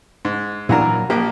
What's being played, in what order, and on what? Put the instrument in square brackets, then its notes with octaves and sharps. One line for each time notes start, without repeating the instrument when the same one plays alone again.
[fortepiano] G#2
[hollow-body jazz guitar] A#2 F#3 A#5 [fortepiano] E3 D4 A#4
[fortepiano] A#1 A#3 [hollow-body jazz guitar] G4